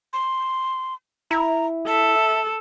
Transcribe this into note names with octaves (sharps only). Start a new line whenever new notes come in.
C6
E4 A#5
A4 E5